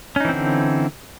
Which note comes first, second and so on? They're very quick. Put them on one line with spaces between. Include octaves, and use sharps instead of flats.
C#4 D#4 E3 C4 D3